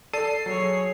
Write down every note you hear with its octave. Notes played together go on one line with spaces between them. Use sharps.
A4 D5 A5 C7 D#7
F#3 G#4 C#5